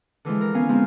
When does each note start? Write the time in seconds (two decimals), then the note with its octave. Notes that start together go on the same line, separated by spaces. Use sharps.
0.25 D3 E3 F3 G#3
0.41 A#4
0.54 B3 C#4 F5 G#5
0.69 F3 G#3 B3 C4 D#4 F4